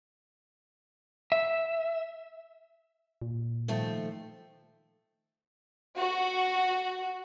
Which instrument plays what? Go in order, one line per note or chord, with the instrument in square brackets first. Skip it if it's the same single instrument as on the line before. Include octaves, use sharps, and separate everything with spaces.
[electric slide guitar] E5
[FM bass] A#2
[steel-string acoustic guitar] D#3 F3 A3
[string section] F#4